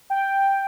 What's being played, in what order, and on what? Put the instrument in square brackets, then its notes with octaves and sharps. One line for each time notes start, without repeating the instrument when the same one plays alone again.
[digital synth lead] G5